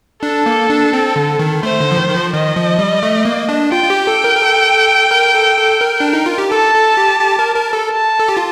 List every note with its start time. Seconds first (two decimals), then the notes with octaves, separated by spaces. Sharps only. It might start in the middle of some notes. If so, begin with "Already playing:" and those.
0.23 D4 A4
0.46 A#3
0.70 D4
0.93 C4
1.16 D3
1.39 D#3
1.63 A3 C5
1.80 D3
1.92 F3
1.97 D#3
2.09 D#3
2.15 F3
2.33 D#3 D#5
2.56 F3
2.79 G3
3.03 A3
3.25 A#3
3.49 D4
3.72 F4 G5
3.84 F4
3.90 G4
4.07 A4
4.24 A#4
4.36 A#4
4.42 A4
5.11 A#4
5.35 A4
5.58 A4
5.81 A#4
6.00 D4
6.13 D#4
6.26 F4
6.38 G4
6.52 A4 A5
6.74 A4
6.97 G4
7.21 G4
7.39 A#4
7.56 A#4
7.73 A4
7.90 A5
8.20 A4
8.28 G4
8.37 F4